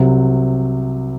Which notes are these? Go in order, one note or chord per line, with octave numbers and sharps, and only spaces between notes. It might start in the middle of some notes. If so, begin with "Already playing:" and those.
Already playing: C2 C3 F#3